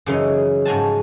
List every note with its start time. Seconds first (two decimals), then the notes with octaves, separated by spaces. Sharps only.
0.06 F#2 C#3 E3 D#4
0.65 G#2 F3 F#4 G#5 A5